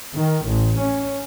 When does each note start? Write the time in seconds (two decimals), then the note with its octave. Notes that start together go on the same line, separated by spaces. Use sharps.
0.15 D#3
0.48 A1
0.80 C#4